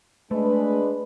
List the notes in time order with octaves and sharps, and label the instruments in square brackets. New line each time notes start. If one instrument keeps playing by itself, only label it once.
[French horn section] G#3 D4 B4 [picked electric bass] A3